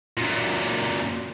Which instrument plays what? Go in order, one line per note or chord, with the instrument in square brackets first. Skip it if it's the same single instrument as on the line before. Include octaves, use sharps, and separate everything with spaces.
[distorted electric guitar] F#2 A#2